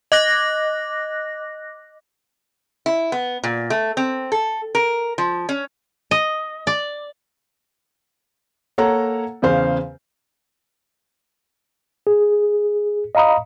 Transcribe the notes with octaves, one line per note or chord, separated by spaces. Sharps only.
D#5 D6 F#6 A#6
E4
B3
A#2
A3
C4
A4
A#4
F3
C#4
D#5
D5
A#3 A4 C#5 F#5 A#5
E2 C#3 C5 F5
G#4
D#5 F5 A#5 B5 D#6